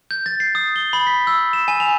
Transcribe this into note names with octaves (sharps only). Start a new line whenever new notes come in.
G6
A6
C7
D#6
G7
B5
B6
E6
E7
G#5
F7